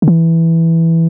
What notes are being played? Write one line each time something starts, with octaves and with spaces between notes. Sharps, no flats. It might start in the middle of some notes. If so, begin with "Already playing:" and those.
D3
E3